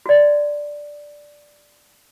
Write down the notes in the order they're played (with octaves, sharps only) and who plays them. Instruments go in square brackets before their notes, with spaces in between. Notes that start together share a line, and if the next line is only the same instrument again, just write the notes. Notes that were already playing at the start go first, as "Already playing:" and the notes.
[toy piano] F#4 D5